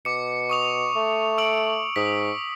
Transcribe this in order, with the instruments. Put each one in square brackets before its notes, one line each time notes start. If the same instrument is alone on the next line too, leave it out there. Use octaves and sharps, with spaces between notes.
[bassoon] B2 [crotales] D6 C#7
[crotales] C#6 D#6 F7
[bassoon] A3
[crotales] E6 D7 F#7
[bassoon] G#2 [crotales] D#6 B6